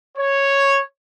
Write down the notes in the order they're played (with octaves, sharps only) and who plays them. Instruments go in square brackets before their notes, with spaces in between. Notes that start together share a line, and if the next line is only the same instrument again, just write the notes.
[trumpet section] C#5